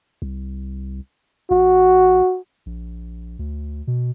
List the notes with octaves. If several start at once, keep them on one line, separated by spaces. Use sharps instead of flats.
C2
A1 F#4
A#1
D2
B2